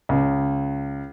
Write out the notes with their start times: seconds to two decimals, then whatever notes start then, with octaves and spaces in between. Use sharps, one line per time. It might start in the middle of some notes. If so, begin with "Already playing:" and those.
0.09 C#2